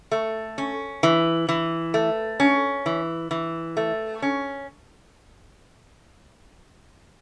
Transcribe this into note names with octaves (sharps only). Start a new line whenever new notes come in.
A3
C#4
E3
E3
A3
C#4
E3
E3
A3
C#4